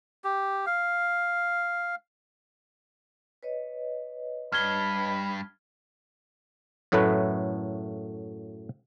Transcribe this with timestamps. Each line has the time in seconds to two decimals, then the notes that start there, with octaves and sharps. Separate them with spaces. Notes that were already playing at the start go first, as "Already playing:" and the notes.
0.24 G4
0.67 F5
3.43 B4 C#5 D#5
4.52 G2 B5 F6 G#6 G7
6.92 F#2 A2 F#3 A3 B4